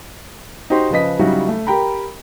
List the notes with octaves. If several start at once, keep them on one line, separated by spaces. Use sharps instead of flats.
D#4 F#4 G4 C5 C6
C#3 F3 B4 D#5 B6
C#3 F#3 G3 D#4 E4 F#4
A3
G4 A#4 G5 A#5 B5